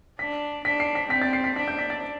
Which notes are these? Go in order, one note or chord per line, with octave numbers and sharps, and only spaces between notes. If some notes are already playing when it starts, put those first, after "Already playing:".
D4 B6
D4 B6
C7
B6
C4 B6
A6
C7
B6
D4 B6
G6
B6
A6